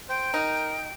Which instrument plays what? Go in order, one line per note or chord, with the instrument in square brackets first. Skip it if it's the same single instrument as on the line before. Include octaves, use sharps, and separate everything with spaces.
[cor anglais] C5 [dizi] G5
[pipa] D#4 [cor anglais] A#4